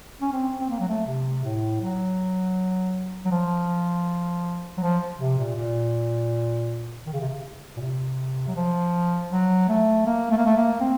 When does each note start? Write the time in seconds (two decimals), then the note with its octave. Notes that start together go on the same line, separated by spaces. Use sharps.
0.21 C#4
0.32 C4
0.60 C4
0.69 A#3
0.80 F#3
0.88 A3
1.07 C3
1.44 A2
1.81 F#3
3.25 F#3
3.31 F3
4.77 F#3
4.81 F3
5.19 C3
5.38 A#2
5.56 A#2
7.06 D#3
7.13 C#3
7.21 C3
7.28 C#3
7.76 A#2
7.80 C3
8.47 F#3
8.56 F3
9.31 F#3
9.69 A3
10.06 A#3
10.31 A3
10.37 A#3
10.45 A3
10.56 A#3
10.80 C4